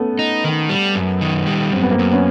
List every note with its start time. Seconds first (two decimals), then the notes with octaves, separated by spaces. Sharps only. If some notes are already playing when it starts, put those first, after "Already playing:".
Already playing: A3 B3 C#4
0.19 D#4
0.44 D#3
0.69 G3
0.95 F#2
1.21 D#3
1.47 G3
1.72 F#2 C4
1.82 B3
1.90 A#3 C4
1.99 F#2
2.12 B3 C#4